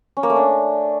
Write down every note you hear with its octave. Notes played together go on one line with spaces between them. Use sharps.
C#4
A#3
A3
D4